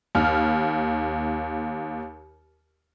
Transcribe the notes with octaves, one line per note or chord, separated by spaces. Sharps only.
D#2 F6